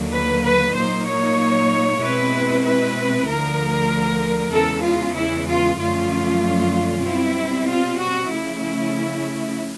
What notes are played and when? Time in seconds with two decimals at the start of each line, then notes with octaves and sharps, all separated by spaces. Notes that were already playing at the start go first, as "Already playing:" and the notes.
Already playing: D#2 D3 F#3 A#3
0.13 B4
0.43 B4
0.75 A#2 F#3 A#3 D#4 C5
1.07 C#5
2.01 B2 G#3 C4 E4 B4
2.64 B4
3.27 D2 D3 F3 A#4
4.52 E2 C#3 E3 G#3 A4
4.84 F4
5.15 E4
5.47 F4
5.78 F#2 D3 F3 A3 C#4 F4
7.04 B2 G3 C4 E4
7.68 F4
7.99 F#4
8.31 C#3 F3 A3 C#4 E4